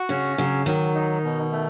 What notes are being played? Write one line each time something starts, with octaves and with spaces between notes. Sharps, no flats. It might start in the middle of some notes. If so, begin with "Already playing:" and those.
Already playing: F#4
C#3 C#4
C#3 F#3
D#3 F#3
D#4
B2
A3